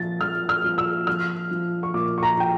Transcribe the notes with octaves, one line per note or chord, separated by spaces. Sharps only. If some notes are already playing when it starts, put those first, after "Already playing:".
Already playing: A#2 F3 A6
F3 F6
F6
F3
E6
F3 F6
F3
C#6
A#2 D6
C#6
A#5
F3 G5